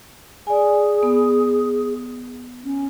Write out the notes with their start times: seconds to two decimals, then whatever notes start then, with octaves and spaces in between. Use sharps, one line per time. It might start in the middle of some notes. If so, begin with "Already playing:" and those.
0.47 G#4 D5 G#5
1.03 B3
2.64 C#4